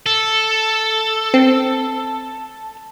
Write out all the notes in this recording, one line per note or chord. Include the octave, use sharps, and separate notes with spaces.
A4
C4